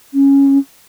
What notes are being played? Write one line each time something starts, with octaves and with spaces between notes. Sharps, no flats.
C#4